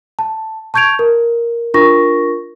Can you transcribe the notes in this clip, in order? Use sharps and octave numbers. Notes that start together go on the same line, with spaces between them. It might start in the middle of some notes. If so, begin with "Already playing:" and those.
A5
A5 C#6 G6 G#6 D7 F7
A#4
D4 F4 A#4 C#6 A#6